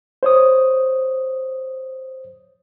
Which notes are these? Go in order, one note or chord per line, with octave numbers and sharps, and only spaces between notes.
C5 C#5 D#6